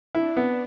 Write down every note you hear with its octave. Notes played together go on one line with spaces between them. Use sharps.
D4 E4
B3